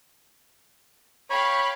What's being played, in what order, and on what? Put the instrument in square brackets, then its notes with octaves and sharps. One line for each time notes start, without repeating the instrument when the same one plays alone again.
[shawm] C#5 [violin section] F5 G5 B5